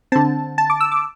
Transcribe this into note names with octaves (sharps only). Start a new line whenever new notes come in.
D3 C4 A5
A5
D6
E6
D6